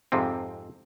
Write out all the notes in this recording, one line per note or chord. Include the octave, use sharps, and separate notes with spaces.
F2 G#2 C3 C4